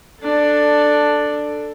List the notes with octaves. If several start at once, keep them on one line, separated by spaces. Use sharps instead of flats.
D4 A4